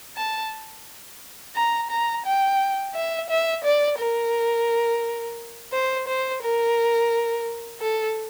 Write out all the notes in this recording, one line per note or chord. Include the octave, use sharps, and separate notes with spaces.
A5
A#5
A#5
G5
E5
E5
D5
A#4
C5
C5
A#4
A4